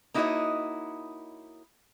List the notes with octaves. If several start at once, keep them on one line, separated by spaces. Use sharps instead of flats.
A#3 D#4 E4 F#4 C#5 D#5